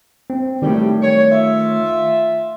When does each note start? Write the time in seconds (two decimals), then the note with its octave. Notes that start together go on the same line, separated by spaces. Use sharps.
0.30 C4
0.62 A2 D#3 F#3 G3 A3
1.02 C#5
1.31 F4 E5